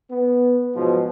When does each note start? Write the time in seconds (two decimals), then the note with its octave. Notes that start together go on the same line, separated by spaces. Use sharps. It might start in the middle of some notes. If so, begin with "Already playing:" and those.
0.10 B3
0.74 G#2 B2 F3 F#3